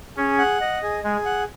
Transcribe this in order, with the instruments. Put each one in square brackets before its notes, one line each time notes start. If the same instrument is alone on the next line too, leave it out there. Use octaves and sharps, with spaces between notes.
[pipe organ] C#4 [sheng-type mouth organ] G#4
[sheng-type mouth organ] F#5
D#5
G#4
[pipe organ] G#3 [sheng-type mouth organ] G#4
[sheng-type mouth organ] F#5